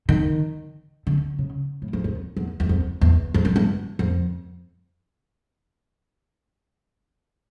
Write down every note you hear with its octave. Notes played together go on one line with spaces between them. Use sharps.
D#3
D3
C#3
A2
F2
F2
E2
E2
F2
E2
F2
F#2
G2
F2